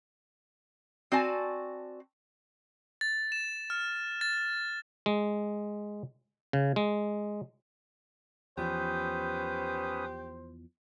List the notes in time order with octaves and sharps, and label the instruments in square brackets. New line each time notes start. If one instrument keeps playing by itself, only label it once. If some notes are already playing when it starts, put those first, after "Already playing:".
[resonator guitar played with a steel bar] C4 F#4 D5 G#5 A5
[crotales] A6
E7
F6
A6
[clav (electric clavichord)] G#3
C#3
G#3
[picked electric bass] E2 F3 [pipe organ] C#4 B4 D#6 [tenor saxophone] G4 [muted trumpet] C5